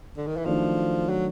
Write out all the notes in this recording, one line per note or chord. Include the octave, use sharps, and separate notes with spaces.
D3
D#3
E3
D#3 F3 F#3 A3 D4
F#3